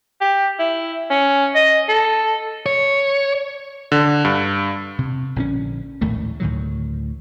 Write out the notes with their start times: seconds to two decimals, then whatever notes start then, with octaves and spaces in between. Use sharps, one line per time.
0.21 G4
0.59 E4
1.10 C#4
1.55 D#5
1.89 A4
2.66 C#5
3.92 D3
4.25 G2
4.99 C3
5.36 A#1 D3 C4 C#4
6.01 A#1 D#2 A2 A3
6.40 D2 A2 D#3 F#3